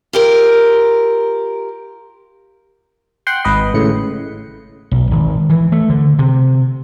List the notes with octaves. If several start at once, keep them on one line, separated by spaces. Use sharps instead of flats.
F4 G4 A#4
F#5 G5 C6
G#1 B4 D#5
A2 C#3 C#7
B1
G#1
E3
A3
D3
C3